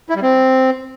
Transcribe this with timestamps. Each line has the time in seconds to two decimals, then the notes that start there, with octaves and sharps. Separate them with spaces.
0.10 E4
0.16 G3
0.22 C4